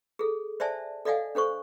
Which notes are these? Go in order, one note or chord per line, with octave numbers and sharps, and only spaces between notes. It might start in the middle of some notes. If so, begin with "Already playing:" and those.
G#4 A4
C5 D5 E5 G#5 A5
A4 D5 D#5 F5 F#5 G#5
D4 A4 C5 C#6